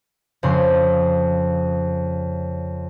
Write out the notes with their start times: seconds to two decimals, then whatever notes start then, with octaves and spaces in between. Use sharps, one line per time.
0.43 F2 C#3 C6